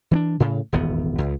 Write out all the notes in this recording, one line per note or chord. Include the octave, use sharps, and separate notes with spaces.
E3 C4 D4
A2 C#3
D#1 G#1 E2 B3
C#2